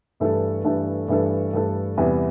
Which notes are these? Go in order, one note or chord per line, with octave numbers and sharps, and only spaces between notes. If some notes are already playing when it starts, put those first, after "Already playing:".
G2 E3 A3 D4 A4
G2 E3 A3 D4 A4
G2 E3 A3 D4 A4
G2 E3 A3 D4 A4
E2 C3 E3 G3 B3